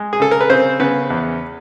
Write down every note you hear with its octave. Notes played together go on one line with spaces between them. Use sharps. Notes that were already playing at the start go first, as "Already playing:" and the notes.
Already playing: G#3
G#4
C#3 A4
A#4
B4
C#3 C4 C5
C#3 B3 B4
E2